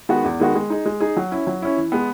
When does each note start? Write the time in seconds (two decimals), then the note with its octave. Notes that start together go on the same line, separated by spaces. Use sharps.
0.09 D#3 G#3 B3 F#4
0.24 E2
0.40 D#3 G#3 B3 F#4
0.55 G#3
0.70 D#4 G#4
0.86 G#3
1.00 D#4 G#4
1.17 F#3
1.32 C#4 E4
1.47 F#3
1.62 C#4 E4
1.77 E3
1.92 G#3 B3